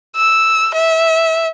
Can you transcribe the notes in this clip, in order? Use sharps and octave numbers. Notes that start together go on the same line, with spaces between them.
E6
E5